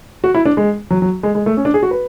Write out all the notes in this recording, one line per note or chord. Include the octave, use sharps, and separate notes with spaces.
F#4
E4
D4
G#3
F#3
F#3
G#3
G#3
A3
C#4
D4
G#4
F#4
B4